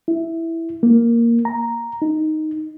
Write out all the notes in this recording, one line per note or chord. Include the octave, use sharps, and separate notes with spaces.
E4
A#3
A#5
D#4